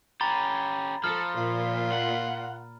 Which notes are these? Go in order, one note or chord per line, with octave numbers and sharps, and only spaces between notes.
C#4 G4 A#5 B5 A6
F3 A4 F6
A#2 F4
F#5